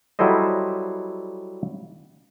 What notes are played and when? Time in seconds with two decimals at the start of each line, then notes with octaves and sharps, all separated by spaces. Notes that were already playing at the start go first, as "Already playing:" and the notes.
0.19 F#3 G3 E4 A4 C5 D#5